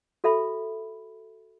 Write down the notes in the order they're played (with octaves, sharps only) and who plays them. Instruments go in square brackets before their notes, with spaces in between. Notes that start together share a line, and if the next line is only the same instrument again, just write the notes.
[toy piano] F#4 A4 E5 B5